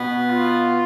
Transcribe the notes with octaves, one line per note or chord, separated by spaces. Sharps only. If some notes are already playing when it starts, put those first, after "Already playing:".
Already playing: B2 B3
F4